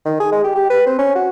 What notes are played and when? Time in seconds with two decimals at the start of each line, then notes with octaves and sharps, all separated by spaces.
0.05 D#3
0.20 G#4
0.32 G#3
0.44 G4
0.55 G4
0.70 B4
0.86 C4
0.98 C#4
1.15 F#4